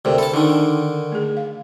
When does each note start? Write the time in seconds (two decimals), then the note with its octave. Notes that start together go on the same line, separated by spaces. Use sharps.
0.05 D2 C3 A4 A#4 D5
0.18 A4 A5 B5
0.34 D3 D#3 D4 D#4
1.12 A3 G#4
1.37 F5